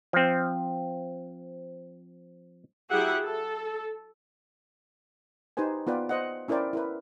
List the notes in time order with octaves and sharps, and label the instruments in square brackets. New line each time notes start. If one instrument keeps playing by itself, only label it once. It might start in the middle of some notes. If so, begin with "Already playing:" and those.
[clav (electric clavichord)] F3 C4
[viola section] F#3 E4 G4 G#4 E5 F#5
A4
[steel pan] D#4 G4 B4 C5 G#5
B3 F4 B4 D5 G5
C5 D#5 F#5
C#4 E4 A#4 C5 D5 G5
E4 A#4 B4